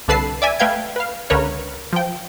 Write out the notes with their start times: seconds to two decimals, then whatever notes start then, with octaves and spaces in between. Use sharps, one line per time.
0.08 C2 D3 A4 B4 A5 C7
0.42 D5 E5 G#5
0.59 A3 B4 F5 G5 G#6
0.96 B4 F5
1.30 C#2 D3 A#4 B4 C#5
1.93 F3 G5